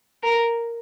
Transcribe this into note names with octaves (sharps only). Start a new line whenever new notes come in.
A#4